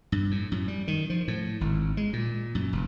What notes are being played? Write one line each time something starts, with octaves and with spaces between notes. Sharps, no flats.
G2
A2
F#2
G3
D#3
F3
A2
G#1
G#3
A#2
F#2
F1